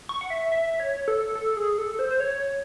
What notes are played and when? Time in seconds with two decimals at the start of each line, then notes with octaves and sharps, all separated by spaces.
0.09 C#6
0.21 F#5
0.30 E5
0.52 E5
0.80 C#5
1.08 A4
1.35 A4
1.57 G#4
1.78 A4
1.99 C5
2.11 C5
2.20 C#5